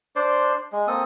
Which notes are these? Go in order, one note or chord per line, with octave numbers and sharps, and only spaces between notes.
D4 C5 D5 C6
G#3
A#3 C4 A4 D#6